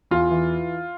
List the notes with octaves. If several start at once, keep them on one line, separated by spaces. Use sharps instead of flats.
E2 F4
E3